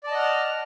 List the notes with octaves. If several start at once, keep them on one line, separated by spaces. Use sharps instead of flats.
D5 D#5 F#5 A5 F6